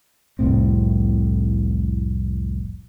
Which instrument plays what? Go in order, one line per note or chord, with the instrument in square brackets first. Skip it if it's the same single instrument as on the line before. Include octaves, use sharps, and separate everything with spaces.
[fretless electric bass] F1 C2 A2 C4